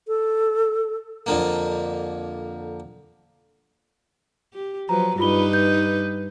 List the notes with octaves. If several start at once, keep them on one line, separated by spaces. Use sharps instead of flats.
A4
F2 D3 A#3
G4
F3 F#3 B4 A#5
G2 D#4 F4 B4 B5 G7
G6